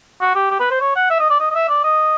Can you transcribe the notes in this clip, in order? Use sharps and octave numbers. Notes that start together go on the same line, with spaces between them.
F#4
G4
G4
B4
C5
C#5
F#5
E5
D#5
D5
D#5
D#5
E5
D5
D#5